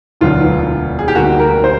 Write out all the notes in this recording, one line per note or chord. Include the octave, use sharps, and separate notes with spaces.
E1 D2 D3 F#3 B3 F4
G#4
G4
D2 D3 G3 A#3 F#4
A#4
C5